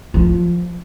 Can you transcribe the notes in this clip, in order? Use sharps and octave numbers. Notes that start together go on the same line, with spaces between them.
F3